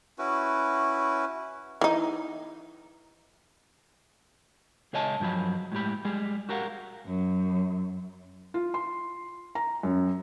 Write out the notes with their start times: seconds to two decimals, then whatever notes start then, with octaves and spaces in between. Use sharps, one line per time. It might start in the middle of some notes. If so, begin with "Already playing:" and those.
0.19 C#4 E4 F#4 B4
1.81 E3 D#4
4.93 C#2 G#4 C#5 D#5 G#5 A5
5.20 G2 F3 F#3 B5
5.72 A2 G#3 G4 B5
6.05 G3 G#3 G4 G#4
6.49 F#4 G4 A#4 F5 F#5
7.06 F#2
8.54 F4
8.74 C6
9.55 A#5
9.83 F#2